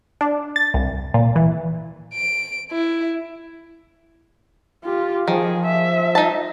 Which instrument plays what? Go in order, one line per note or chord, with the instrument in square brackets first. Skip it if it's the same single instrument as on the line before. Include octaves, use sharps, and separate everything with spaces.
[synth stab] D4
A6
C2
A#2
E3
[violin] D7
E4
[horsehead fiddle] F4 G4
[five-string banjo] D#3 [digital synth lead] F3 [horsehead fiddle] G#4
[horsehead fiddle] E5
[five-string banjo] D#4 A5